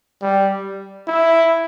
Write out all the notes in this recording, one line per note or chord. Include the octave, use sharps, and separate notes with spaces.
G3
E4